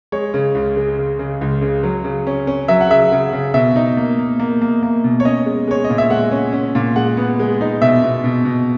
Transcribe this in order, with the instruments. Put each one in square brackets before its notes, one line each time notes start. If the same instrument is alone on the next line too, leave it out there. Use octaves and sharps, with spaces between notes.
[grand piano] G#3 C#5
C#3
C#2
G#3
C#3
C#3
C#2
C#3
F#3
C#3
C#4
C#4
F#3 E5
F#5
C#3 E5
C#3
C#3
B2 E5
D#4
A#3
A#3
A#3
A#3
A#3
B2
C#5
C#4 D#5
G#3
G#3 C#5
D#5
A#2
E5
G#3 F#5
C#4
C#4
A#2
G#3 F#5
B3
G#3
D#4
B2 E5
B2
B2
B2